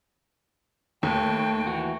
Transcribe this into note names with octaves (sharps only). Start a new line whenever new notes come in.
D#2 A3 G5
E3 F#4